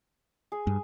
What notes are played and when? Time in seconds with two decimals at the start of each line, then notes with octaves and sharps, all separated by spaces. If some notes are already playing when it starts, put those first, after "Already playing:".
0.52 G#4
0.67 G2